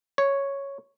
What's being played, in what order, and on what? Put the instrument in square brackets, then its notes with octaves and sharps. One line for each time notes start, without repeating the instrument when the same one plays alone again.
[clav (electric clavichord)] C#5